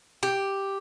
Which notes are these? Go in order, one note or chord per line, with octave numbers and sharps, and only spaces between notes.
G4